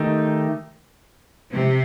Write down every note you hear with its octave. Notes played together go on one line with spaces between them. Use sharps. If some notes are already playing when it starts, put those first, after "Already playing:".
Already playing: D#3 A3 D#4 G4
C3